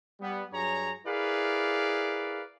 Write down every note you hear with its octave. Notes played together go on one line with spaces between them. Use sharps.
G3 B3
G2 F#3 G#4 C#5 A#5
E4 G#4 A#4 B4 D5 F5